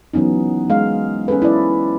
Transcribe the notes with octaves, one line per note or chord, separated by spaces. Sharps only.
E3 F#3 B3 C#4 D#4
G#3 F5
C#4 G#4 A4 B4
E4 D5